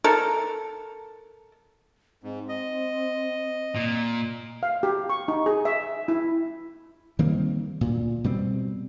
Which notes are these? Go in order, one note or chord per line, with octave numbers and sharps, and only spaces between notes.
A4 A#4
G#2 C4
D#5
A#2
F5
G4
C#6
D#4
G#4
E5
E4
D#3 G3 A#3 C4
D2 A#2
B2 G3 G#3 C4